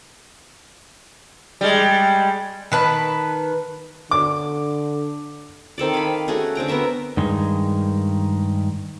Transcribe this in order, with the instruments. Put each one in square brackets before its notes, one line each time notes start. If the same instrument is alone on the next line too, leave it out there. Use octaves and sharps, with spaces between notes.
[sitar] G3 G#3
[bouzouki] D#3 B4 A5
[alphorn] D3 [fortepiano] D6
[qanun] D#3 C4 A4 D5
F5 G#5 B5
A3 C#4 F#4 G#4
D3 C4 G5 A#5
B3 F#4 A#4 E5
[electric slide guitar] G2 D#3 G#3